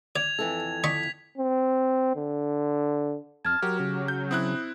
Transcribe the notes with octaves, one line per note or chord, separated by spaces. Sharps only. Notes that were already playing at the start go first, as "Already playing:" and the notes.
D5 G#6 F7
F2 E3 A4
D5 D#5 C#6 B6
C4
D3
F2 A5 F6 G#6
F#3 F#4 G4 A#4
C#3
G6
C4 E4 D#6 F#6